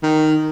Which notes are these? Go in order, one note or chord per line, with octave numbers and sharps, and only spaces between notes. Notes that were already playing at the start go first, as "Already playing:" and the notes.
D#3